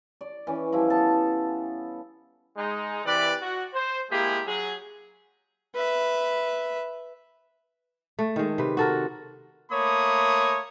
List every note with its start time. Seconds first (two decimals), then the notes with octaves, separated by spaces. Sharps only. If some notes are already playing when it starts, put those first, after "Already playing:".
0.21 D5
0.47 E3 C#4
0.72 F3 G3 E4
0.90 B3 A4 A5
2.57 G#3 D#4
3.05 C3 E3 G4 B4 D5
3.41 F#4
3.74 C5
4.10 G#3 A#3 E4 G4 G#4
4.46 F#3 G#4
5.75 B4 E5
8.19 A3
8.36 D#3 G#3
8.58 C3 B4
8.77 F#4 A4 A#4
9.72 A3 A#3 C#5 B5 D#6